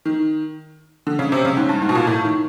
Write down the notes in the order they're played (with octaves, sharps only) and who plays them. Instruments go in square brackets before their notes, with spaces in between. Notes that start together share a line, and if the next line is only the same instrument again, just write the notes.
[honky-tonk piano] D#3
D3
C#3
C3
C#3
G#2
G2
G#2
B2
A#2
A2
D#3